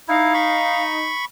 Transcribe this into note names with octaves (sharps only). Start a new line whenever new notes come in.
D#4 E4 F5
B5 C#6